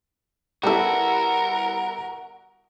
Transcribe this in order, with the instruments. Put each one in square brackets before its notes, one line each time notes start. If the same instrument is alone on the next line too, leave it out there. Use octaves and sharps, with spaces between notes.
[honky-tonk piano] G3 B3 E4 [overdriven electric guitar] F#4 [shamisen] G4 A4 [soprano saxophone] A#4